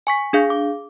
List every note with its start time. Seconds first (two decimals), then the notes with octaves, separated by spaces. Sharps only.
0.07 G#5 C#6 B6
0.33 D4 G#4 F5 G6
0.50 D6